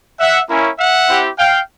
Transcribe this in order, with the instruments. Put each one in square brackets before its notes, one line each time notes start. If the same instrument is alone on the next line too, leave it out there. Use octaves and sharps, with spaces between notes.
[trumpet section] E5 F#5
A#3 C#4 E4
E5 F#5
C4 E4 G4
F5 G5